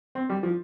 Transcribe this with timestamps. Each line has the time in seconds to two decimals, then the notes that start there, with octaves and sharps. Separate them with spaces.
0.15 C4
0.30 G3
0.43 F3